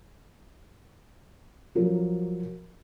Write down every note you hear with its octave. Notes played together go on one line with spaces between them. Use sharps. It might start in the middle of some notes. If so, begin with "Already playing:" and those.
F3 F#3 A#4